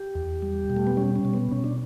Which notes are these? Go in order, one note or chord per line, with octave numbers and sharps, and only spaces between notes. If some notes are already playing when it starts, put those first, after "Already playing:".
Already playing: G4
E2
G3
B2
A3
B3
G3 C#4
C#4
B2
B3
B2 C#4
D4